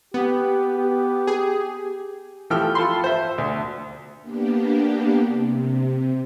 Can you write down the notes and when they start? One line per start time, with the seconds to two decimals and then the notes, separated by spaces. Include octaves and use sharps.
0.14 B3 G4
0.78 G4
1.27 G#4
2.50 E3 F3 A3 G4 G5 F6
2.75 F4 A4 A5 B5 C6
3.04 C5 E5
3.38 D2
4.21 A#3 B3 D4 G4
5.26 C3